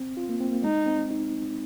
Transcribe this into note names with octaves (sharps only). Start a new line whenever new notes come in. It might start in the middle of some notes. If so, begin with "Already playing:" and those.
Already playing: C4
F4
A#3
C4
A#3
G#3 D#4
C4
D#4